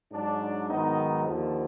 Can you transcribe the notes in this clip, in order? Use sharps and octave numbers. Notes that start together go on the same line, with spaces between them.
G#2 F#3 D4
G#2 D#3 F#3 B3 D#4
D#2 D3 F3